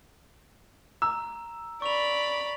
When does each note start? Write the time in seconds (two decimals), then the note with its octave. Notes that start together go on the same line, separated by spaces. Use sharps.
1.02 A#5 E6
1.82 D5 B5 C#6 F7